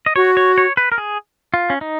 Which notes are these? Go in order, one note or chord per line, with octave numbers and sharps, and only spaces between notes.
D#5
F#4 C#5
C#5
C#5
B4
A#4
G#4
F4
C#4
D#4